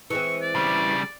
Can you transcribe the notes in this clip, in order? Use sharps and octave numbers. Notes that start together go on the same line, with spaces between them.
E3 G#3 C4 C#6
D5
C#3 G3